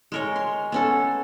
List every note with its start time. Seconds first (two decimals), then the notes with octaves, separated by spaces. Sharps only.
0.12 G#3 A#4 C#5
0.36 C6
0.72 B3 C#4 A4